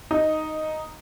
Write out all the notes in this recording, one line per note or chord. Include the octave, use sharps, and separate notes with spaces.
D#4